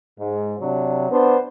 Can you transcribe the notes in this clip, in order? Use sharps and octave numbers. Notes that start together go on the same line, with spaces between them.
G#2
C3 F#3 D4
B3 D4 C5